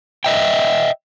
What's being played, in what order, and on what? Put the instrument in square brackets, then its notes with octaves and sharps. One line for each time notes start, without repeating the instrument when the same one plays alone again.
[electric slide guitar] D#5 E5 G5